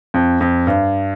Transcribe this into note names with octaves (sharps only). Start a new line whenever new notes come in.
F2
F2
G2